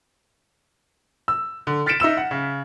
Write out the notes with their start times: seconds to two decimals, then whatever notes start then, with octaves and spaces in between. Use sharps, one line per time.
1.28 E6
1.67 D3
1.86 F6 A6 B6 C#7 D7 E7
2.00 D#4 E5 E6 E7
2.17 F#5
2.31 C#3